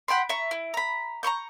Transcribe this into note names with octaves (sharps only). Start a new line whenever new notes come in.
F#5 G5 B5 C6
E5 A#5 C#6
E4
A#5 B5
A#5 C6 C#6 G6